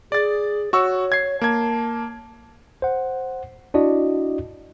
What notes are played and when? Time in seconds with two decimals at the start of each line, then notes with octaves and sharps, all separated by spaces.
0.12 G#4 D5 A6
0.73 F#4 C#5 C#6 E6
1.12 G#6 C7
1.41 A#3 A5 G#6
2.82 C5 F#5
3.74 D4 E4 F#4 D5 D#5